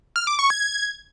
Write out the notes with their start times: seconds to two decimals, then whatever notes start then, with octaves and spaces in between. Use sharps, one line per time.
0.16 F6
0.27 D6
0.39 C#6
0.50 G#6